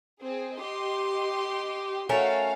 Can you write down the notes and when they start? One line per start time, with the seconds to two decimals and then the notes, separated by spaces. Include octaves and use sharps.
0.22 C4 G#4
0.59 G4 D#5 C6
2.09 A3 C#4 F#4 A#4 F5